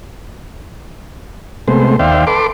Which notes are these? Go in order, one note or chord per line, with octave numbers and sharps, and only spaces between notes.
C3 G#3 A3 B3 C5
D#2 C5 D5 E5 F5 G5
A4 B4 C6 D6